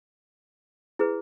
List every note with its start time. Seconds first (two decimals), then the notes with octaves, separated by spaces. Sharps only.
0.99 E4 G#4 B4